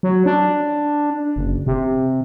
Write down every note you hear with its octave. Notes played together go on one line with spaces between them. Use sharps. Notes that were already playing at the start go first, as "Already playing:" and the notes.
F#3
D4
F#1
C3